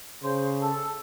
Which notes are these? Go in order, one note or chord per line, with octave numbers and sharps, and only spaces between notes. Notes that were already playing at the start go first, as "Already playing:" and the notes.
C#3 C5
A4